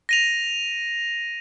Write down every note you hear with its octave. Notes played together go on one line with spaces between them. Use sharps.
A#6 D#7 F7